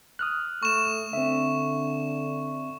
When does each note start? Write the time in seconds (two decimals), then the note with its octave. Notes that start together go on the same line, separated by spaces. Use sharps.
0.19 D#6 F6 F#6
0.63 A3 C#6 E7
1.13 D3 C4 E5